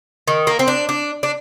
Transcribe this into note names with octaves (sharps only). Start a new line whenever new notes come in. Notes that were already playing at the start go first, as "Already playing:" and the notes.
D#3
A#3
C4
D4
D4
D4